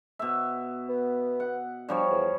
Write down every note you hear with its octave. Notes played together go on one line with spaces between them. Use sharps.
B2 E5
B3
F#5
F3 G3 D4 C#5
E2